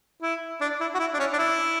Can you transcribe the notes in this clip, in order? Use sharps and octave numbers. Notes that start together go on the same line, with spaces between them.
E4
D4
E4
F#4
E4
D4
C#4
D4
E4